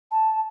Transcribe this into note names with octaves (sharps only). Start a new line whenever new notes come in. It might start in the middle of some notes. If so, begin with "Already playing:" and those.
A5